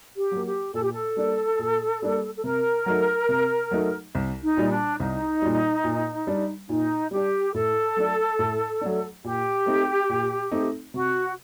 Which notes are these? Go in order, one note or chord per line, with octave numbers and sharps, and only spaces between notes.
G4
F#3 A#3
G4
A#2 A4
G4
A4
G3 A#3 D4
A#2
G3 A#3 D4
A4
C3 A#4
F#3 A3 D#4
C3
F#3 A3 D#4
C2
D#4
A#2 G3
D4
C2 D#4
A#2 G3
A#2
G3 D4
A#2 D#4
G3 D4 G4
A2 A4
F#3 A3 D4
A2
F#3 A3 D4
A#2 G4
A3 C4 D#4
A#2
A3 C4 D#4
C3 F#4